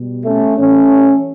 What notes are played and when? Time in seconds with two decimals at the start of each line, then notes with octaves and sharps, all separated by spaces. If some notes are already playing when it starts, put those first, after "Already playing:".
Already playing: B2 G3
0.25 A3 C#4
0.57 A2 E3 G3 A3 C#4